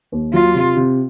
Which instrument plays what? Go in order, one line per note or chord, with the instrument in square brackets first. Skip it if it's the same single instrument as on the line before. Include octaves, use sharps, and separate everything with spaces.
[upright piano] D#2
[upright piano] F#3 [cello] F4
[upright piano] C3
C3